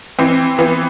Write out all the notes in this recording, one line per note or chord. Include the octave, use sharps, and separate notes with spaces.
E3 C4
E3 B3